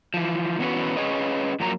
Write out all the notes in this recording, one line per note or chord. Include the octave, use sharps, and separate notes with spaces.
E3 F3
E3 B3 C#4 F4 F#4 B4
C#4 G#4 B4 C#5 D#5
F#2 F3 F#3 A#3 A#5